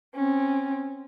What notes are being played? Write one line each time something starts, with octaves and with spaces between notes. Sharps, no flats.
C4 C#4